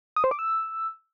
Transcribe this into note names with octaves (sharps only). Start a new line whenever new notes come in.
D#6
C5
D6
E6